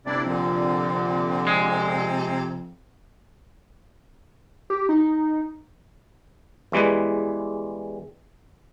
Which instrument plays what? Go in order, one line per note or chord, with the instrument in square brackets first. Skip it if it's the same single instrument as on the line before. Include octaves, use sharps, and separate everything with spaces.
[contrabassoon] G1 [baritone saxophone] C3 [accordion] D4 E4 D5
[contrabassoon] F2 [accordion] A#2 D3
[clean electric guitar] G#3
[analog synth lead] G4
D#4
[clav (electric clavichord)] E2 E3 G3 G#3 B4